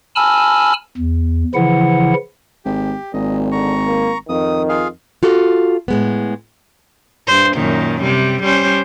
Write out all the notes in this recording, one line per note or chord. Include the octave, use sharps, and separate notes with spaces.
G#5 A5 B5 E6 F6
E2
C#3 E3 F3 E4 F#5
G#1 G4
G#1 A#2 D#5
D3 A#5 C#6
A#3
F2 D#3 D#6
F4 G#4 F5
F4 F#4 A4
A2 G#3 B3
G2 C5
F#2 A#2 D#3
C3 G3
G3 C#4 C5